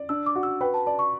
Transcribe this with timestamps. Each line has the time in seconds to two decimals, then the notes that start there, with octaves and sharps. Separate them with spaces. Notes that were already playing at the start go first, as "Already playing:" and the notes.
Already playing: D5
0.09 D4 E6
0.26 D6
0.36 F#4
0.43 E6
0.61 B4 G5
0.74 A5
0.86 D5 A5
0.99 C#6